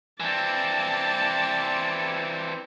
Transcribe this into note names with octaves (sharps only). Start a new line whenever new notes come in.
E3 C4 D5 A5